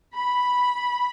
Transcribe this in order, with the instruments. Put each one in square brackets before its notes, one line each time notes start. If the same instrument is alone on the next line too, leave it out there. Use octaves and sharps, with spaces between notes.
[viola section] B5